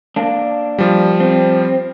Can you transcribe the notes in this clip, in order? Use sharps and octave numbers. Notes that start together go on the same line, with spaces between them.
A#3 D4
F3 G3
C4